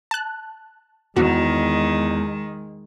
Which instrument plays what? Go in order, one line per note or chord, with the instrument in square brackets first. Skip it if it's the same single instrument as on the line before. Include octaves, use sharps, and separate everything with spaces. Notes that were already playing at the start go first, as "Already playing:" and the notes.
[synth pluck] A5 F#6
[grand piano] E2 [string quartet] D#3 [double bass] G#3 [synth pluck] F#4